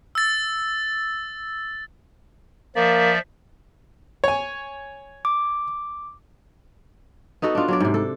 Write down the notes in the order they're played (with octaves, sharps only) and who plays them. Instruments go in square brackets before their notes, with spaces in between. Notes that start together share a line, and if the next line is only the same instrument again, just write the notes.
[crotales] E6 A6
[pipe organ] F3 D5 E5 [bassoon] A#3
[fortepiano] C#5 G#5
[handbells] D6
[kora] B3 D#4 F#4 A4
D4 F4
F#3 D4 D5
G#2 C3
A4